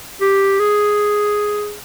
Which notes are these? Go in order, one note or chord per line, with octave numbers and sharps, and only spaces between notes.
G4
G#4